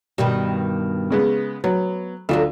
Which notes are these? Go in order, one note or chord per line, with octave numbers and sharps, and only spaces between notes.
G2 B2 D#3 G3
C#3 G#3 B3
F#3 B3
D2 F#3 D4 F4 A4